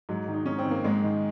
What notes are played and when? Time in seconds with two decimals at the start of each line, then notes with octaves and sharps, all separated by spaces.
0.09 G#2 F#3
0.28 D#3 D#4
0.46 G#2 C#4
0.59 C4
0.65 D#3
0.71 A#3
0.84 G#2 G#3
1.04 D#3